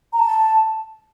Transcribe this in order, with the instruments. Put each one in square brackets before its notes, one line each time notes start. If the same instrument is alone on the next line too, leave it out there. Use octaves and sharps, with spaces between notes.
[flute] A#5
A5